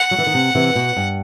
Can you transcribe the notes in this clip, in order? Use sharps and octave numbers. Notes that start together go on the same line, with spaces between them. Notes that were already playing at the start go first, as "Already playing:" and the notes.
Already playing: F#5
F#3
E3
D#3
C3
C3 E3
B2
G2